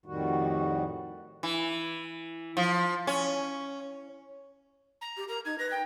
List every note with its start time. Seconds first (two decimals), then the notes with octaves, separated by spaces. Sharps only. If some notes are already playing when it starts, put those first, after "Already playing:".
0.06 F2 A2 D#3 G3 F#4
1.43 E3
2.57 F3
3.07 C#4
5.01 A#5
5.17 G4
5.28 A#4 A#5
5.45 D#4 G#6
5.59 B4 A#6
5.71 G5